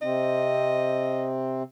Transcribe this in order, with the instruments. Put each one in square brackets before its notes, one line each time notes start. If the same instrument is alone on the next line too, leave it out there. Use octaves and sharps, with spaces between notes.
[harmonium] C3 C4 [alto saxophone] D#5